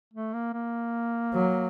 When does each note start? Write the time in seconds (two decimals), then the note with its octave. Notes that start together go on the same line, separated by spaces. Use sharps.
0.14 A3
0.33 A#3
0.53 A#3
1.35 F#3